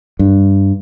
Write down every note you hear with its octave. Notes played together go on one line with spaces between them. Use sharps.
G2